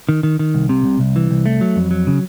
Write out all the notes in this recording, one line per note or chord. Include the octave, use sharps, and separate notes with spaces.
D#3
D#3
D#3
C2
C3
C2
C2
E3
C2
A3
F#3
F2
F#3
C#3